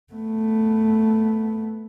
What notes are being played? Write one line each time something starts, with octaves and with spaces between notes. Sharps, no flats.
A3 B3